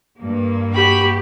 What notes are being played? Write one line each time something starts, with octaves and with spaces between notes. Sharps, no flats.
G2 A#3
F#4 G4 B5